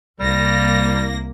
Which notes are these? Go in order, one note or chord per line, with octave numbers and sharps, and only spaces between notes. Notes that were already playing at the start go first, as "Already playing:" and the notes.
C2 G3 A#3 A#6